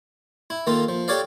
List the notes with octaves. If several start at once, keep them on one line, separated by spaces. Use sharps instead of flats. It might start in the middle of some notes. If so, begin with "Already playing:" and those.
E4
D#3 A#3 F4 A4
F3
G4 A4 C#5 D5 F5